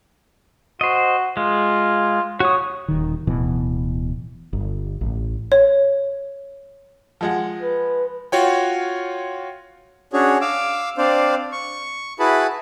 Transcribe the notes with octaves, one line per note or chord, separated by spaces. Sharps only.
F#4 C5 D#5
G#3 F4
F#4 C#5 D#6
D#1 D#3
D1 B2 E3
G1
A1
C#5
F3 G#3 F#5
B4
F4 F#4 C#5 G5
C#4 D4 F#4 G#4 C#5
F5 D6 E6
C4 D4 C5 D5 F5
C#6
E4 F#4 G#4 B4 A5 B5